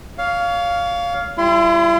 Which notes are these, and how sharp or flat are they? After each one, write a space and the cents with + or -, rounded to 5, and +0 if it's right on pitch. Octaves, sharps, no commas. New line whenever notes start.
C#5 +30 F5 +0
G3 +0 E4 +40 C6 -25